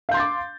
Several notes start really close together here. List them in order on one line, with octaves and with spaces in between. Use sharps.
F5 G6 C6 A6 D6